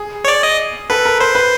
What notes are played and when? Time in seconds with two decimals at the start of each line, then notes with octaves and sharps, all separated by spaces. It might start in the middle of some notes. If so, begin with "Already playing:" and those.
Already playing: G#4
0.24 C#5
0.28 D5
0.43 D#5
0.90 A4 B4
1.05 A#4
1.20 B4 C5
1.35 B4